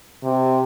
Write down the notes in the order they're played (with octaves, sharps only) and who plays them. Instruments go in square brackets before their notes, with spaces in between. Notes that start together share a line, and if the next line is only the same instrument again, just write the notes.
[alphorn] C3